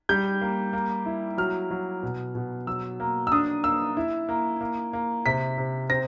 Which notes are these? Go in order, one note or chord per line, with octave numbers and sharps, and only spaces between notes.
G3 G6
A#3
A#3
E4
F#3 F6
F#3
B2
B2
F#3 E6
A#3
E6
D4 D#6
A#3 E6
E4
A#3
A#3
A#3
C3 B6
C3
C4 A#6